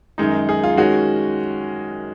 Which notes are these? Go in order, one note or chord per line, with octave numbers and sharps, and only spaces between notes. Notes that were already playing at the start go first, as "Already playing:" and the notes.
F#2 D#3 G#3 D#4
G#4
F4
D#3 G#3 C#4 F#4